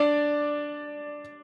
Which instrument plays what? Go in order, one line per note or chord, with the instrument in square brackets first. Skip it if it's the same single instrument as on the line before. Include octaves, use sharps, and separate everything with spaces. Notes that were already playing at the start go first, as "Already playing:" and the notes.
Already playing: [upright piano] D4 D5